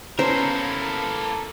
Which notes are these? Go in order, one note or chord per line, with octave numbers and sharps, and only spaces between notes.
A#3 B3 C#4 E4 A4 A#4 C5